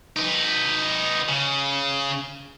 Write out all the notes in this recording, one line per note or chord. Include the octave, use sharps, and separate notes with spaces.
D#4 B4
C#3